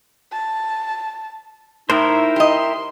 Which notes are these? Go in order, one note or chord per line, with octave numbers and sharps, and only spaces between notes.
A5
A2 D#4 E4 A#4 C5 E5
G4 D#5 C6